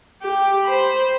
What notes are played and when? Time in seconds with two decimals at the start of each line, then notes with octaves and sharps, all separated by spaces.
0.23 G4
0.64 C5 B5